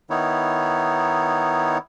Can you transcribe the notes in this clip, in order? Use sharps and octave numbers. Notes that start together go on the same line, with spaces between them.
D#3 B3 D#4 E4 C#5